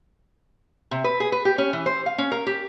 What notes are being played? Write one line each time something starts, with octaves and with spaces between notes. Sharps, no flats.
C3
B4
G#4
B4
G4
C#4
E3
C5
F5
C#4
A#4
G4